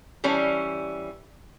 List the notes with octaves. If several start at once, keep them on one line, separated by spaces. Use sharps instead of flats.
E3 G3 C#4